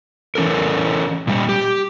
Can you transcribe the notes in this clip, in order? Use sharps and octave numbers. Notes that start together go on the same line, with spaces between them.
E3 C#4 A4 A#4
A#2 G3
G4